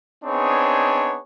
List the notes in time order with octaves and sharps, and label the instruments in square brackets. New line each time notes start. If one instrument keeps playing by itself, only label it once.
[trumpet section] B3 C4 D4 D#4 G#4 C#5